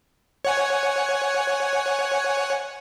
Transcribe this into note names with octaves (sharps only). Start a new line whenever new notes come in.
C#5 F#5 G#5